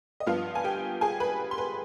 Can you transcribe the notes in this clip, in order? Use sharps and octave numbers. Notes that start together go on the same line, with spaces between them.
D#5
G2 F3 B3 F4 F5
G#5
G4 G5
G#4 G#5
B4 B5
C6
B4 B5